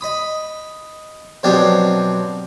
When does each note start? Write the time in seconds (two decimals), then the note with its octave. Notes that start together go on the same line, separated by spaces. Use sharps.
0.01 D#5 B5 D#6
1.43 B2 F3 F#3 C4 D4 G4